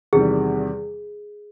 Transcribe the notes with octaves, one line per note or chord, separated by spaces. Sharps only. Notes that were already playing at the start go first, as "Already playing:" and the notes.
E2 C3 D#3 G3 G#4